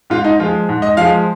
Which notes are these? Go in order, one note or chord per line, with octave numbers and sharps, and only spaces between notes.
G#2 F4
D#4
F3 G#3 F4
G#2
D#5
F3 G#3 F5